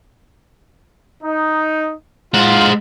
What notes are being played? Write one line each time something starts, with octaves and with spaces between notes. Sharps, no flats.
D#4
G#3 F4 F5 F#5